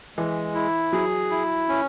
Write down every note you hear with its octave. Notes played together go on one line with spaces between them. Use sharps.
E3 G#3
E4
F#3 G#4
E4
C#4